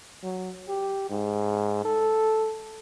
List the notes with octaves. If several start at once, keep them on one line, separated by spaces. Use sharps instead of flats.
F#3
G4
G#2
A4